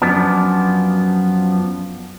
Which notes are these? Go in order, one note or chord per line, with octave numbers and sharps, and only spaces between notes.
F#2 F3 B3 D4